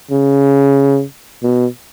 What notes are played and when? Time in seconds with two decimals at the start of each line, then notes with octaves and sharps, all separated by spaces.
0.11 C#3
1.43 B2